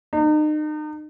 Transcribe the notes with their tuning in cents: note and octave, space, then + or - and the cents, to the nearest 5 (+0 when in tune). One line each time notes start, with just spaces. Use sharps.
D#4 -35